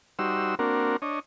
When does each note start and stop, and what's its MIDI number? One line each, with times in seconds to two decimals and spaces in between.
0.19 0.55 55
0.19 0.55 63
0.19 0.55 66
0.19 0.55 72
0.19 0.55 88
0.59 0.96 58
0.59 0.96 60
0.59 0.96 62
0.59 0.96 66
0.59 0.96 70
1.02 1.20 62
1.02 1.20 73
1.02 1.20 75